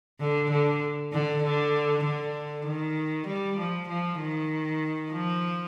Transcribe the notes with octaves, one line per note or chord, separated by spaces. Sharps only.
D3
D3
D3
D3
D3
D#3
G3
F3
F3
D#3
F3